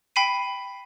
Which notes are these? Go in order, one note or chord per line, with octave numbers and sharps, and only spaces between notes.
G5 B5 B6 C7 D#7